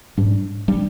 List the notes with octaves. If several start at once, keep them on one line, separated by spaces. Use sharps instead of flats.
G#2 G3 D4
G3 D4